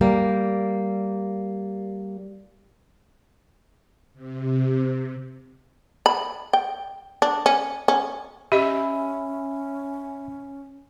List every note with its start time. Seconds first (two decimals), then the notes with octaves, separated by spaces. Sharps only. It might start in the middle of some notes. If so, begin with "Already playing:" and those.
0.01 G3 A#3
4.14 C3
6.06 B5
6.53 G5
7.22 D4
7.46 C#4
7.88 C#4
8.52 C#4 G4 D#5 E5 B5